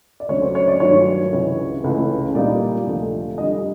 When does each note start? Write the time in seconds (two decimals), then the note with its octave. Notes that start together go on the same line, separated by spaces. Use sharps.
0.20 D5
0.28 D2 C#3 F#3 A3 D4 C#5
0.42 C5
0.55 C#5
0.68 D5
0.80 G2 D#3 F#3 A3 C#5
1.32 C#2 C3 E3
1.84 C#2 C#3 E3 A3 C#4
2.35 A#2 G3 A#3 D#4 D5
2.87 D2 C3 F3 A3
3.38 F2 D3 G3 D#5